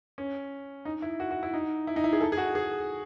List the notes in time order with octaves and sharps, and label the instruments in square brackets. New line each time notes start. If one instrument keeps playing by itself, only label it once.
[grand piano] C#4
D#4
E4
F#4
F#4
E4
D#4
E4
D#4
E4
G#4
A4
G#4
F#4
G#4